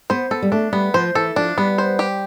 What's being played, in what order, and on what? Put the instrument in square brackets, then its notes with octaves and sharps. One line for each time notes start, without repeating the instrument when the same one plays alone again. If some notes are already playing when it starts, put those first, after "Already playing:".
[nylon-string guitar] B3 [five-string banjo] C5
[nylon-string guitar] B3 [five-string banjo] A4
[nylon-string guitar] G3
[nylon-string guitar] A3 [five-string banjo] D4
[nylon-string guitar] G3 [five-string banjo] B3
[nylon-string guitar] F3 [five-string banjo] C5
[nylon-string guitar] E3 [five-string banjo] A4
[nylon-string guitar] F3 [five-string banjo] D4
[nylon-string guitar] G3 [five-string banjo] B3
[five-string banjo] C5
G4